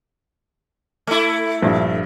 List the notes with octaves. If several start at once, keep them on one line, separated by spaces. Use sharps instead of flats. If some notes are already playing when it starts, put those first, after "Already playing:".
A3 E4
A#1 G2